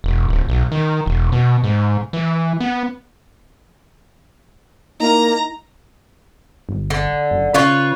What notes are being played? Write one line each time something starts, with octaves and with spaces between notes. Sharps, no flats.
E1
D1
B1
D#3
E1
B2
G#2
E3
B3
A#3 D#4 E4 A#5
G1
D3
F#1
C#3 F4 B4 C#5